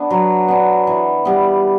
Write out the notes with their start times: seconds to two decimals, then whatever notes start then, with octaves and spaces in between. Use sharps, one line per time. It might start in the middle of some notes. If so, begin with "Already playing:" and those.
Already playing: B3 D4
0.11 F#3
0.48 B3 D4
0.87 E3
1.25 G3 B3